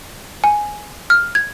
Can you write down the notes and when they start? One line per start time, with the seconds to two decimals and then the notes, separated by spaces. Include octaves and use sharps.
0.44 G#5
1.10 F6
1.35 G#6